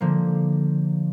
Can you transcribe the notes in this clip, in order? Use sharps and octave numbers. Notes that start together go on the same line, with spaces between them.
D3 F3 A#3